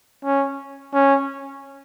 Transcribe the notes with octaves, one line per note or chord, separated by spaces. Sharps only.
C#4
C#4